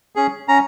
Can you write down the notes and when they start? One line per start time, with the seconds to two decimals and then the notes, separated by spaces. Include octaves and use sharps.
0.16 C#4 G#4
0.48 C#4 A#5